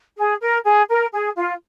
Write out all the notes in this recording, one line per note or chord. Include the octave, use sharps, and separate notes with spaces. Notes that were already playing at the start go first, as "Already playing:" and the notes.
G#4
A#4
G#4
A#4
G#4
F4